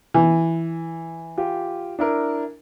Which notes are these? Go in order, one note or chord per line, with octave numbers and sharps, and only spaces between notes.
E3
F4 G4
D4 E4 A#4